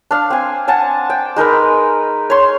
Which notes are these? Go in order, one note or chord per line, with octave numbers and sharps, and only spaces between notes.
D4 F5
C4 G#5
F#5 G#5 A5
G5
G#3 D#4 A#4 B4
C#5 C6